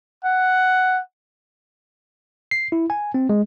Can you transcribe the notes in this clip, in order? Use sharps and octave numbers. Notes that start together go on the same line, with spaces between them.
F#5
C7
E4
G#5
C4
G#3